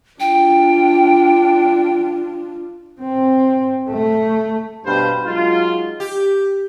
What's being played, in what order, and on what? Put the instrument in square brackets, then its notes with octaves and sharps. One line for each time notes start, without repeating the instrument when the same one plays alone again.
[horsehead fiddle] D4 F4 [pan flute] G5
[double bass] C4
A3
[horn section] G2 B2 D4 C5 F5 B5
F#3 G#3 D#4 F4
[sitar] G4